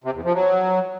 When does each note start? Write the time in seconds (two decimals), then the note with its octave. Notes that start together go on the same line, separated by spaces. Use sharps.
0.04 C3
0.14 E2
0.24 F3
0.34 F#3